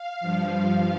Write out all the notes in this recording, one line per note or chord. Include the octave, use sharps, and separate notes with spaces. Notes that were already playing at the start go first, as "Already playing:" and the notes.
Already playing: F5
G2 F3
F5